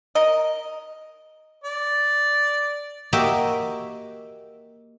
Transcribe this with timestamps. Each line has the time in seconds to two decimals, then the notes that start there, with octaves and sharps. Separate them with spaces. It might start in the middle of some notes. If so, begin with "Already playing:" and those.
0.15 A#4 D#5
1.64 D5
3.13 A#3 F#4 G4 D#5 E5 G5